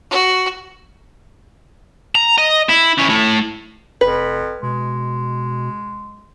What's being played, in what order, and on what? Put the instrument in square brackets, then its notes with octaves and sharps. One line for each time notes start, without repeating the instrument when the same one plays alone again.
[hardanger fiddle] F#4
[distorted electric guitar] A#5
D#5
E4
C#4 E4
A3 E4
[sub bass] F1 [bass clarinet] F2 [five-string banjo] B4
[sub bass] B2 [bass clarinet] G#3